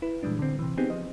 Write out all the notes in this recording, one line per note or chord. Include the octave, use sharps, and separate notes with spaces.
E4 B4
A#2 E3 G3 G#3 D4
D3 C4
C3 E3
B3 C4 D#4 G4 G#4
F3 D#5